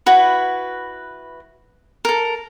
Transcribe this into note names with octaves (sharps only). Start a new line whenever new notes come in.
E4 F#4 B4
A4 A#4